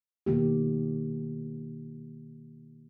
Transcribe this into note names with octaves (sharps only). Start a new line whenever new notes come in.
B2 D#3 A#3 G4